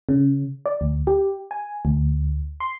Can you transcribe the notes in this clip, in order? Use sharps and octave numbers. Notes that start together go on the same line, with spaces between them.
C#3
D5
D2
G4
G#5
D2
C6